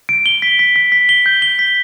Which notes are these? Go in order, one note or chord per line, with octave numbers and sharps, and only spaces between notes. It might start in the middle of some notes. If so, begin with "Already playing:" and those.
D7
G7
B6
B6
B6
B6
G7
G6
G7
B6